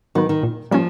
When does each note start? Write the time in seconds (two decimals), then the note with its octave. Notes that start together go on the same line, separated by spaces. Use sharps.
0.15 D#3 F#3 B3
0.29 D#3
0.43 A#2
0.71 F3 G3 A#3 C#4